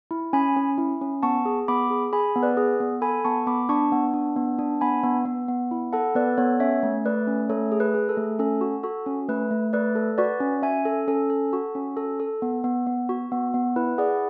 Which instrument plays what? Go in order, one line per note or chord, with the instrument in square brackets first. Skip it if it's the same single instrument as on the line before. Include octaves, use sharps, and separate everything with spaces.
[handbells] E4
C#4 G#5 B5
C#4
E4
C#4
B3 A5 C#6
G#4
B3 B5 D6
G#4
G#4 G#5 B5
B3
B4 D5
G#4
B3
A4 G#5 B5
B3 A5 C#6
B3 B5 D6
D4 A5 C#6
B3
D4
B3
D4
B3 G#5 B5
B3
B3
B3
E4
A4 F#5 A5
B3 B4 D5
B3 A4 C#5
C#4 C#5 E5
A3
A3 B4 D5
C#4
A3 A4 C#5
G#4
B4
G#4
A4
A3
C#4 A4
F#4
F#4 A4
C#4
A3 B4
A3
A3 B4 D5
A4
F#4 B4 D5
C#4
C#4 E5 G#5
A4
C#4 A4
A4
F#4
C#4
A4
A4
B3
B3
B3
F#4
B3
B3
E4 B4
G#4 D5 F#5